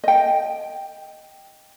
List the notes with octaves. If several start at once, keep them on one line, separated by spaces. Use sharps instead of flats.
D#5 G5